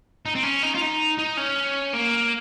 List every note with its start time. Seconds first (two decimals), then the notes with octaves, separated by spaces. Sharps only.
0.26 D#4
0.35 C4
0.43 C#4
0.63 D#4
0.75 F4
0.82 D#4
1.18 D#4
1.37 C#4
1.93 A#3